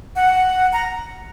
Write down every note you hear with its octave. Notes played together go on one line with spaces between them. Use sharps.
F#5
A#5